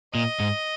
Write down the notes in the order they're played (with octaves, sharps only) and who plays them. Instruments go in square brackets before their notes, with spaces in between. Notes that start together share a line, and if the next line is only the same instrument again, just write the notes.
[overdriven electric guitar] A#2 [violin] D#5
[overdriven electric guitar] G#2